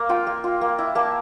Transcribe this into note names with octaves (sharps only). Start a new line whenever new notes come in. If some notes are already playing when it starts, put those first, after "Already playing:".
Already playing: A#3
F4 G5
A#3
F4
A#3
E4
A#3 A5